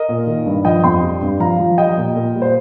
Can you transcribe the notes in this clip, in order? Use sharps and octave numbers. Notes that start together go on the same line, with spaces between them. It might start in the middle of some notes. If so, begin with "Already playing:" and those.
Already playing: A#4 D#5
A#2
D#3
G2
F3 D#5 G5
F2 G5 C6
G3
G2
F3 F5 A#5
F3
G3 D#5 G5
A#2
A#2
G3
C5